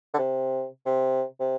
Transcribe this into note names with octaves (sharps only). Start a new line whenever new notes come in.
D3
C3
C3
C3